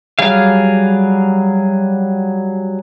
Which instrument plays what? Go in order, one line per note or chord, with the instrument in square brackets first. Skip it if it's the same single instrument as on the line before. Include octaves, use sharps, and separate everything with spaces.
[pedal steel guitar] F#3 G3 G#4 F5